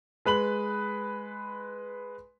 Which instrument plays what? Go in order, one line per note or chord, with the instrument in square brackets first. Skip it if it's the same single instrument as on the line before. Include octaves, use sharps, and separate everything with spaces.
[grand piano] G#3 B4 B5 F#7